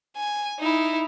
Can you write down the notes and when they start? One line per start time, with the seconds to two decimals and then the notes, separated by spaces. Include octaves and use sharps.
0.17 G#5
0.59 D#4 E4